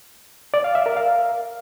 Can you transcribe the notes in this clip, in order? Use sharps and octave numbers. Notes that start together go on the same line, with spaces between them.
D5
F5
E5
A#4
F5